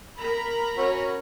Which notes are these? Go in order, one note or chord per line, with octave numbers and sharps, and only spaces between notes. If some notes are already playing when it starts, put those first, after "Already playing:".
A#4 A#5 B5
C#4 F#4